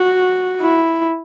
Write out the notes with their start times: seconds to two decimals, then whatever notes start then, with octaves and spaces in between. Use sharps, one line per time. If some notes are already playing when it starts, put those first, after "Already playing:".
Already playing: F#4
0.60 E4